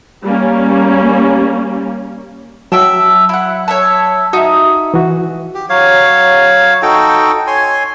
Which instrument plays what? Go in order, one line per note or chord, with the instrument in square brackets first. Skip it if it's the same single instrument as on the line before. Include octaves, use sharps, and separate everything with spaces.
[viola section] G3 A#3 C#4
[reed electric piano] F#3 [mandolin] E5 G5 A5
[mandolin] E4 F#5
C#5 E5 A5
[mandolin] D#4 [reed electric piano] F#4 E5
[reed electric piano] E3 F#4
[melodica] G4
F#3 C#5 F5
D#4 F#4 A4 G5
C#5 G#5 C6